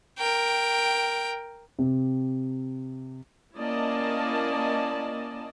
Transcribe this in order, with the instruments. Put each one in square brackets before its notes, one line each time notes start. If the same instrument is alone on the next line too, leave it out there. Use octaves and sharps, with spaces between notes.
[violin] A#4 G5
[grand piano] C3
[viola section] A#3 C#4 E4 D5 D#5 A5